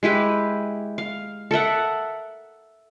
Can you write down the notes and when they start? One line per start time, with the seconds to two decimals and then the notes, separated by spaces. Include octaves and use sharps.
0.03 G#3 E4 G4 B4
0.98 F5
1.51 A4 A#4 E5 F#5